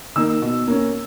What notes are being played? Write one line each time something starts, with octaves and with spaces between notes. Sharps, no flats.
D#3 A#3 E6
B2
A#3 C#4